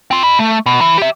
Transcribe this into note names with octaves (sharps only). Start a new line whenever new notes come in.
C4 F4
D#5 B5
A3
B2
E3
G4 E5